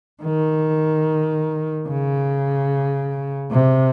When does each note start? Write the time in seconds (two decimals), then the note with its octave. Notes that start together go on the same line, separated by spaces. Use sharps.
0.23 D#3
1.88 C#3
3.51 C3